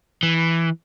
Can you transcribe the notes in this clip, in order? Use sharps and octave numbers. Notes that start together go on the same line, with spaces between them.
E3